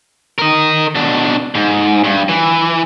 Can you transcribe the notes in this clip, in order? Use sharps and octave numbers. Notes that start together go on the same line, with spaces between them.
A#4 D#5
B2 D4
G#2
G2
E3